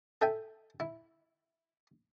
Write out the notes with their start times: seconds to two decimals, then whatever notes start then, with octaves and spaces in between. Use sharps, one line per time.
0.21 A4 E5 G5 G#5
0.80 E4